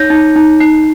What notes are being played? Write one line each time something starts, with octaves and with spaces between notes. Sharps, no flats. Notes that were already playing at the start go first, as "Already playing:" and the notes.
Already playing: D#4 C#5 G6 A#6
D#4
D#4
D#4 C7